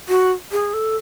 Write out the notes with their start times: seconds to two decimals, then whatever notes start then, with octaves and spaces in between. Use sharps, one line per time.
0.09 F#4
0.52 G#4
0.74 A4